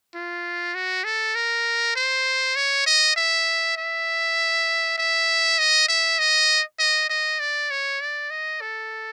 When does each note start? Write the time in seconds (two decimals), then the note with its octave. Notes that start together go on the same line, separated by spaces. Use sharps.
0.14 F4
0.75 F#4
1.04 A4
1.35 A#4
1.96 C5
2.56 C#5
2.86 D#5
3.16 E5
3.77 E5
4.98 E5
5.59 D#5
5.88 E5
6.19 D#5
6.79 D#5
7.09 D#5
7.40 D5
7.70 C#5
8.00 D5
8.30 D#5
8.61 A4